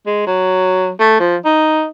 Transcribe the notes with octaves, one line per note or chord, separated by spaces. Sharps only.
G#3
F#3
A3
F3
D#4